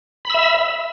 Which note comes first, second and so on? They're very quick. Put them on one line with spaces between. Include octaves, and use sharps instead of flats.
B5 E6 E5